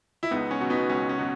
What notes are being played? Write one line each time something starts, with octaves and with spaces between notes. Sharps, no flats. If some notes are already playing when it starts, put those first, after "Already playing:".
E4
C#2 B3 D#4
C#4
B2 F#3
B3 D#4
C#2 C#4
C#4
B2 F#3